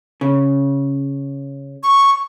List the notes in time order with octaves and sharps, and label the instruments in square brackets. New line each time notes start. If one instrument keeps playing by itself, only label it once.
[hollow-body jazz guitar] C#3
[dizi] C#6